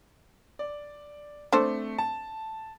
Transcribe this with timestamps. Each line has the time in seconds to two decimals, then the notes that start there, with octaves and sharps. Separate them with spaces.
0.59 D5
1.53 A3 C4 D4 A4 C5
1.98 A5